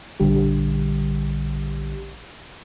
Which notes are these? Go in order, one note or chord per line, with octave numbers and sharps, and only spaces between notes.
A#1 D3 G3 G4